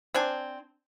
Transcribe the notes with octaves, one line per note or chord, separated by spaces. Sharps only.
C4 D4 G#5